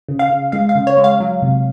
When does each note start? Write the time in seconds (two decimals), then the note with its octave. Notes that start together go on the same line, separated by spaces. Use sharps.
0.09 C#3
0.19 F5
0.30 C#3
0.52 G#3 F5
0.69 F5
0.75 C#3
0.87 C#5
0.97 G#3
1.04 F5
1.20 F#3
1.42 C3